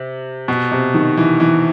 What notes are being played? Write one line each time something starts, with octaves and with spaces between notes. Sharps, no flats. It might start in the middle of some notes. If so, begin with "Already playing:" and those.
Already playing: C3
B2
C3
D#3
E3
E3